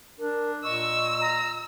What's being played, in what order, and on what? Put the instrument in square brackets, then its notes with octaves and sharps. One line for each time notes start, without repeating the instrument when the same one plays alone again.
[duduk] D4 [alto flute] A#4
[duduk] A#2 [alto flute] D#5 [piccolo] C#6 [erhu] E6
[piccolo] A#5